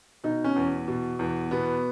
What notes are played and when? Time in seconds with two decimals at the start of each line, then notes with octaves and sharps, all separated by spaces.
0.24 B2 D#4
0.44 C#4
0.56 E2
0.88 B2
1.19 E2
1.51 B2 B3